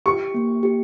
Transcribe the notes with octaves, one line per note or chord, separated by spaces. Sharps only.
G4 C#6
A#3
G4